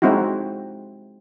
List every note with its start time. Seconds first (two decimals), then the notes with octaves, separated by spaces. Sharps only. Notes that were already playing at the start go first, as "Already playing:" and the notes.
0.02 G#3 C4 D#4 E4 F#4